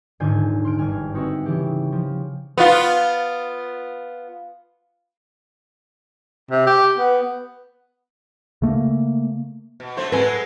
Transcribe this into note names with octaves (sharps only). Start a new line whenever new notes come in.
D#1 G#2 D3 F4 G#5 G6
C6 F6 D7
G1 E2 G#5 F6
C4 D#4 F#4 B4 E5
C#3 E3 G4
F3
B3 F4
C3
G4
B3
C#3 A3 A#3
B2
F#3 A3 C5
F#3 G#3 A4 B4 G#5